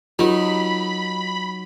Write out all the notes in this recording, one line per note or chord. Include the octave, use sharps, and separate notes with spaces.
F#3 D#4 F4 G4 A#4 C5 B5